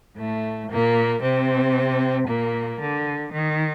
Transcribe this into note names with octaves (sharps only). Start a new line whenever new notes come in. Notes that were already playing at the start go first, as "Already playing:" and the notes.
A2 A3
A#2 A#3
C3 C4
A#2 A#3
D3
D#3